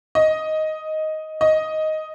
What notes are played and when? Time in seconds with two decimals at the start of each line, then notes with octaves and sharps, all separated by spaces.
0.15 D#5
1.41 D#5